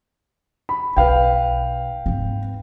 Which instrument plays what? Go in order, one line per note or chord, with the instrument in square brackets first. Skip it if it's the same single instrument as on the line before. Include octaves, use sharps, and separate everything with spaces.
[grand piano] B5
[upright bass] B1 [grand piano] B4 F5 G5
[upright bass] G#2 C4